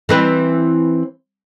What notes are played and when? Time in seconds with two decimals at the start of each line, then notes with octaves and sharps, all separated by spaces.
0.09 E3 C4 B4